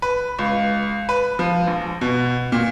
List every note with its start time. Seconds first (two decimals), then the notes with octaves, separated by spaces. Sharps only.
0.02 B4
0.39 C#2
1.09 B4
1.39 F3
1.67 A#1
2.01 B2
2.52 A#2